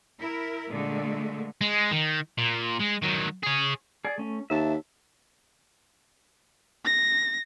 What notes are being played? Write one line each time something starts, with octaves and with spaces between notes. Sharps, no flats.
E4 A#4
A#2 D3 G#3 A3
G#3
D#3
A#2
G#3
D#3 F#3
G#4 C#5
G#4 D5
A3 C#4
D#2 E5 A5
A#6